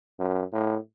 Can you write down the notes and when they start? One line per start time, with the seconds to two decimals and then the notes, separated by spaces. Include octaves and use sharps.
0.19 F#2
0.53 A2